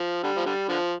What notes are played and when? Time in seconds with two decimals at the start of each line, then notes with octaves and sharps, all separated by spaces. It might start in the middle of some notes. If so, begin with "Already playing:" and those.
Already playing: F3
0.23 D3 G3
0.36 F3
0.46 D3 G3
0.69 D3 F3